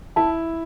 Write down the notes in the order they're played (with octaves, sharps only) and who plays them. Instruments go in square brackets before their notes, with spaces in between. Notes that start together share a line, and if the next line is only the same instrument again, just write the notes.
[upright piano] E4 [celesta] A5